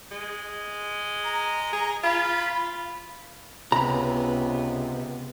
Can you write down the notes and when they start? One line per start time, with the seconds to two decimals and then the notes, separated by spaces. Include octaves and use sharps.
0.11 G#3
1.24 A#5
1.73 G#4
2.04 F4 B5
3.72 C#2 C3 B3 A#5 B5